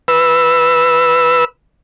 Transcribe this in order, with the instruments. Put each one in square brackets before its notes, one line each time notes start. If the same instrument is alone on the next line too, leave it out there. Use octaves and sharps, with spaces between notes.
[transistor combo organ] B4 E6